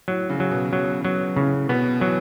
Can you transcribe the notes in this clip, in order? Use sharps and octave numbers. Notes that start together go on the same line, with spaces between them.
A2 F#3
C#3
F#3
B2
F#3
F#3
A2 C#3
B2 B3
E3 F#3